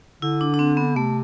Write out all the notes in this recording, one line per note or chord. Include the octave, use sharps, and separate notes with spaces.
D3 E4
D4
D4
C4
B3
C3 A3